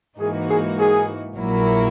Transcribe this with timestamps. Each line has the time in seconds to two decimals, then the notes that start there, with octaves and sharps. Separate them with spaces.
0.19 G#2 E3 A#3 D#4 F#4 G#4
0.48 G#4
0.78 G#4
1.36 A#1 A#2 F#3 A#3 E4